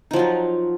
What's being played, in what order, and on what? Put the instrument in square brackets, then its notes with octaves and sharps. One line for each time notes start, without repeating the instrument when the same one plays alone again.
[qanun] D#4
F3
F#3
F4